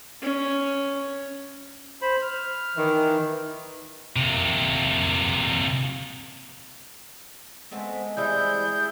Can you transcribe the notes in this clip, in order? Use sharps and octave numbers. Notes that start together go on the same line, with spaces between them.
C#4
C5 B5
F6
D#3 E3
C3 A#3
G#3 A3 B3 C4
E3 G3 C4 E4 G#4 G6